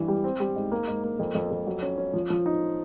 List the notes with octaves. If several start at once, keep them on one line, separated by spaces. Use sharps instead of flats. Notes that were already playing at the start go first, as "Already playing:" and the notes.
Already playing: G2 E3
G3
C4
G3
G#2
A#3
G#2
A#3
F2
F2
F2
F#3
C#4
C#4
F3
F3
D#4